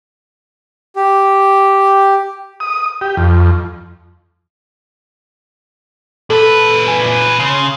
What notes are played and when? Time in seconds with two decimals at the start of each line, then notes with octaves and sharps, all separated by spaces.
0.96 G4
2.60 D#6
3.01 G4
3.17 F2
6.30 A#2 A4 B4
6.87 G#5
7.39 C#3 C6